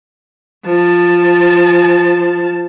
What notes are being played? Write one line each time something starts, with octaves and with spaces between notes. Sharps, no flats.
F3 A5